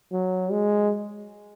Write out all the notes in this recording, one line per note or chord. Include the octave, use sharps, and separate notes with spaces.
F#3
G#3